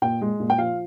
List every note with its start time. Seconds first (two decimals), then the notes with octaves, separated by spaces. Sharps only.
0.02 A#2 G5
0.21 G#3
0.40 A#2
0.50 G5
0.58 F3 F5